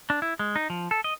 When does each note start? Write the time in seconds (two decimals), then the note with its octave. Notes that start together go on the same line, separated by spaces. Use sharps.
0.10 D4
0.22 E4
0.39 G#3
0.56 D#4
0.70 F3
0.91 A4
1.04 D#5